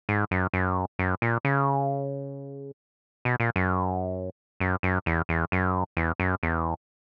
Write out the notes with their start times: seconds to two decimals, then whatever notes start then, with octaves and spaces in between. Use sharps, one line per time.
0.09 G#2
0.31 F#2
0.54 F#2
0.99 F#2
1.22 A#2
1.45 C#3
3.25 B2
3.40 A#2
3.56 F#2
4.60 F#2
4.83 F#2
5.06 E2
5.29 E2
5.52 F#2
5.97 E2
6.20 F#2
6.43 E2